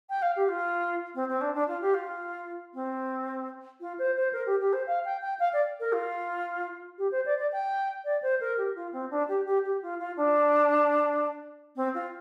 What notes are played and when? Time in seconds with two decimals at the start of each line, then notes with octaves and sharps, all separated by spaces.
0.10 G5
0.22 F5
0.36 G4
0.49 F4
1.15 C4
1.29 C4
1.41 D4
1.55 D4
1.68 F4
1.82 G4
1.94 F4
2.74 C4
3.81 F4
3.99 C5
4.16 C5
4.33 A#4
4.46 G4
4.60 G4
4.73 C5
4.87 F5
5.05 G5
5.22 G5
5.39 F5
5.53 D5
5.80 A#4
5.93 F4
6.98 G4
7.12 C5
7.26 D5
7.38 D5
7.52 G5
8.04 D5
8.23 C5
8.41 A#4
8.58 G4
8.75 F4
8.93 C4
9.11 D4
9.28 G4
9.46 G4
9.65 G4
9.82 F4
9.99 F4
10.17 D4
11.76 C4
11.94 F4